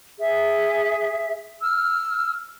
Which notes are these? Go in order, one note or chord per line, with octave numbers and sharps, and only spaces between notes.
G#4 E5
E6 F6